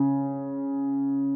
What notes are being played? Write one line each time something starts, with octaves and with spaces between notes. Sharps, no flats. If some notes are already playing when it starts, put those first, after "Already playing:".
Already playing: C#3